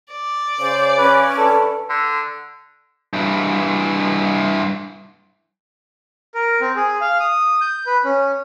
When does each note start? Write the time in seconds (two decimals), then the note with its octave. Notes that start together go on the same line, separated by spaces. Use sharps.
0.13 D5
0.59 C#3 C5
0.98 C#4 B4
1.37 E3 D4 A4 B4
1.90 D3
3.13 G2 E3
6.35 A#4
6.61 C4
6.76 G#4
7.01 F5
7.20 D#6
7.61 G6
7.86 B4
8.05 C#4